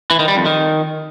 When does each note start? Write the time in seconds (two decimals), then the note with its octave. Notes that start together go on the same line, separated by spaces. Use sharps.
0.11 E3
0.19 D#3
0.28 G3
0.37 F2
0.45 D#3